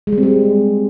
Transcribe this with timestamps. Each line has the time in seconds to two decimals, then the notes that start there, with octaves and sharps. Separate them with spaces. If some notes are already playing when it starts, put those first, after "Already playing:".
0.07 G#3
0.12 G3
0.18 C4
0.23 G#3